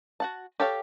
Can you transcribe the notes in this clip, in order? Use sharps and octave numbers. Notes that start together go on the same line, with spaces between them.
F#4 F#5 A5
G4 A4 C#5 F5